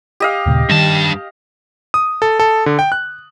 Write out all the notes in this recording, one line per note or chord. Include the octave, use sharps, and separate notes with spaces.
G4 D#5 F5
D#2 A#2 C#3
G2 D#3 G3 A5
D#6
A4
A4
D3
G5
F#6